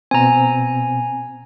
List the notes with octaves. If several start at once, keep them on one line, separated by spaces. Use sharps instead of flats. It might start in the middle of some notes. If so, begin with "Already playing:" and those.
B2 C4 G#5 A#5